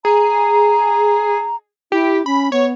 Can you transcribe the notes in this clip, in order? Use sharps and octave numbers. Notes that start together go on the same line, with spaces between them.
G#4 A#5
E4 G4
C#4 B5
B3 C#5